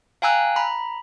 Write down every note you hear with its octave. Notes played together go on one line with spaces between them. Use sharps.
F5 G5 G#5 A#5 E6 F#6
A#5 B5